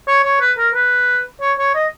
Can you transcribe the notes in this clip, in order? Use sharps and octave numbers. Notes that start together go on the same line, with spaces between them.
C#5
C#5
B4
A#4
B4
C#5
C#5
D#5